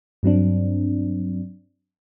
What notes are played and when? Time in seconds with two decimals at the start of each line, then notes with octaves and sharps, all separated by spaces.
0.23 G2 F#3 C4 D4